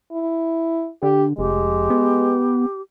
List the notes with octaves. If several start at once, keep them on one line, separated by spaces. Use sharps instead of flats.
E4
D3 G4
F1 G#3 G4
B3